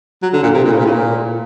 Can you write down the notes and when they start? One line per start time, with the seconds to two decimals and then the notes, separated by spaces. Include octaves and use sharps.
0.23 F#3
0.33 D3
0.43 A#2
0.54 C3
0.64 A#2
0.72 A2
0.79 A#2
0.85 A2
0.92 A#2